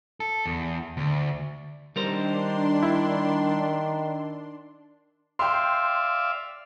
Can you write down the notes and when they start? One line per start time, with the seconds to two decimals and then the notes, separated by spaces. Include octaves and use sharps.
0.20 A4
0.46 E2
0.97 D2
1.96 D#3 G3 D4 A#4 C5 C6
2.82 E4
5.39 D5 E5 F5 G5 C6